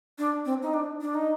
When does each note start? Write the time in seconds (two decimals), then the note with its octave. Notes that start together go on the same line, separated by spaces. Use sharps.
0.18 D4
0.45 C4
0.62 D#4
0.74 D4
1.01 D4
1.14 D#4